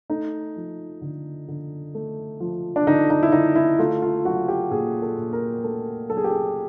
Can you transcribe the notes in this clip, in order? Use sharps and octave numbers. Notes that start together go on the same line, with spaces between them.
A3 D#4
F3
D3
D3
A3
F3
D4
D3 D#4
D#4
E4
D3 D#4
E4
A3 F4
F4
F#3 F#4
G4
A#2 G#4
A4
A#2
A#4
A3 A4
F#3 A4
G#4
G4
G#4